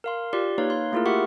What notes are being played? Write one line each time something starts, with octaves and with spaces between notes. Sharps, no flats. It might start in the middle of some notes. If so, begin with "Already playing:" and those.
A#4 F5 C6
F4 G4 D5 C6
A#3 D#4 B4 C#5 F5
C6
A3 A#3 E4 F4 G#4 A#4
G4 A#4 E5 F#5 C#6